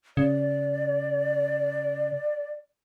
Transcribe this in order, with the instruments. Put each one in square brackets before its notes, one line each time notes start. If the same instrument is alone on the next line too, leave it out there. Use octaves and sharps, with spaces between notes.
[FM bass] C#3 [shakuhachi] D5